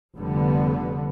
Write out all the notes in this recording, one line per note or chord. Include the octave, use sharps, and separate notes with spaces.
F1 D3 G3 B3